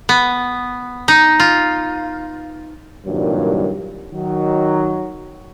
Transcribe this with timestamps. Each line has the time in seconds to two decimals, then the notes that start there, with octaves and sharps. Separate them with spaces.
0.09 B3
1.08 D#4
1.40 F4
3.06 C2 G2 A#2 D#3 F#3 G3
4.13 D#3 F#3